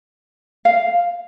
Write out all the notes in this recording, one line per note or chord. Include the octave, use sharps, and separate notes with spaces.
F5